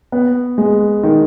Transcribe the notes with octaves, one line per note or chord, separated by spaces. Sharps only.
B3
G#3
D#3